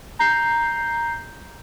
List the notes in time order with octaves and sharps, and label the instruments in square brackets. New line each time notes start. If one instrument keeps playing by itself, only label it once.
[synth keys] A#5 G6 C7